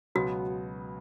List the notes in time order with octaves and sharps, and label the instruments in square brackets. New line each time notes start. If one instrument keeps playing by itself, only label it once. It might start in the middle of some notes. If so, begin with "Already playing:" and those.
[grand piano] C#2 B2 F#3 B3 [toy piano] F#4